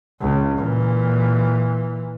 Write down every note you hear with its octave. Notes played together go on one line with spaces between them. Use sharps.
C#2
A#2 E3